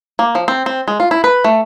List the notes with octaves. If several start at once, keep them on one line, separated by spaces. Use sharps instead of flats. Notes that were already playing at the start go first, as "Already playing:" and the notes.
A#3
F3
C4
C4
G#3
F4
E4
B4
A3